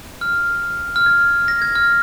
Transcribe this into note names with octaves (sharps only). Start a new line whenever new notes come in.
F6
F6
G#6
A#6
G#6
F6